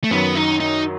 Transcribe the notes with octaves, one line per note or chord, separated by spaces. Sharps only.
A3
F#2 D#3 F#3 B3
D#4
D#4